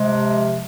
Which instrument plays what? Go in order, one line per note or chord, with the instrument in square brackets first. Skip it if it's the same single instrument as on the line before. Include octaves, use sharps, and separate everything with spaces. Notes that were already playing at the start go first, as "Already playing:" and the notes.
Already playing: [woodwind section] C3 F3 G#3